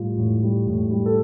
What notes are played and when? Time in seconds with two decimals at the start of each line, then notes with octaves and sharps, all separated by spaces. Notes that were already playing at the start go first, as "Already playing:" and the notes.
Already playing: A2 G3 F4
0.17 A2
0.42 G3
0.67 A2
0.90 G3
1.06 A4